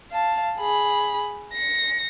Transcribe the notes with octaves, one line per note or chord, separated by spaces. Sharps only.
F5 A5
G#4 B5
A#6 C#7